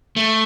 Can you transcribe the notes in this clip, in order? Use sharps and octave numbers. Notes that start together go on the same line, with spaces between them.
A3